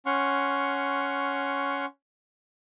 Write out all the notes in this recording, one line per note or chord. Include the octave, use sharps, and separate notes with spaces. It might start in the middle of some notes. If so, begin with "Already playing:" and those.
C#4 F#5 C6 C#6 F6